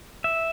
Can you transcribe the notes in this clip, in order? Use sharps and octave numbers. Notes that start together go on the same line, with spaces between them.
E5